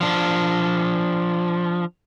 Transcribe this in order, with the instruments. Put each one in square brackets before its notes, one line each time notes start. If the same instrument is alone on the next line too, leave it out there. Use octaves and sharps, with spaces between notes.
[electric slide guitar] F3 D4